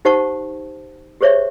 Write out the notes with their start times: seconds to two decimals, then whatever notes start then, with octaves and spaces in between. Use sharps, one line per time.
0.05 D#4 G4 C5 F#5 A5 C#6
1.21 G4 G#4 C5 C#5 E5 C#6